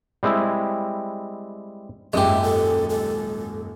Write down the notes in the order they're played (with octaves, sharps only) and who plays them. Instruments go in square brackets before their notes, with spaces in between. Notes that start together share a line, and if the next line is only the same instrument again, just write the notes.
[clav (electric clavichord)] G3 G#3 C4 E4
[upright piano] D#1 G#1 F#2 [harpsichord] G#3 G4 [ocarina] E5
[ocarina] A4
A4